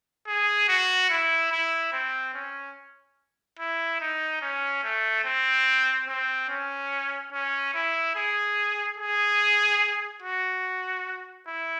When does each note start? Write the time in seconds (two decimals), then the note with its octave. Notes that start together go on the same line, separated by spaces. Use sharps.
0.27 G#4
0.68 F#4
1.10 E4
1.51 E4
1.92 C4
2.34 C#4
3.59 E4
4.00 D#4
4.42 C#4
4.84 A3
5.25 C4
6.08 C4
6.49 C#4
7.33 C#4
7.74 E4
8.15 G#4
8.98 G#4
10.22 F#4
11.47 E4